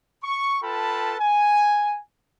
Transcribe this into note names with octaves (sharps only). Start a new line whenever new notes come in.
C#6
F4 A4 B4 G5 A5 B5
G#5